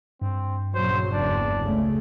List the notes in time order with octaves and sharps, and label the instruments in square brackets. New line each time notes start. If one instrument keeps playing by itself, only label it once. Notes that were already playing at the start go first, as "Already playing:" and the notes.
[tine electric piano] G2 [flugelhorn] C4
[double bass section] A#1 C#3 F#3 [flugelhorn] C5
[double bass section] F#1 E2 [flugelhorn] D4
[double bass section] C#2 C#3 A3